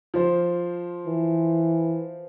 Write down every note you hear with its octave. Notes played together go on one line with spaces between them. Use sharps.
F3 C5
E3